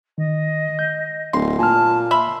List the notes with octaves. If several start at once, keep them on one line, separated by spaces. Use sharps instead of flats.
D#3 D#5
G6
D1 C6
A#2 G#5 A5 F6
E5 B5 C6